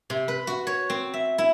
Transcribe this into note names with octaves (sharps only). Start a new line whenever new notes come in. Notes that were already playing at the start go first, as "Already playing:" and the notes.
C3
B4
F#4
C#5
C4
E5
E4